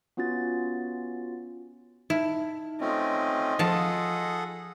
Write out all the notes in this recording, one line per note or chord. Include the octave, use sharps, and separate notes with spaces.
B3 C#4 F4 F#4 A6
D#4 E4
A3 C4 C#4 F4 D#5
F3 G#4 A4 F#5 A5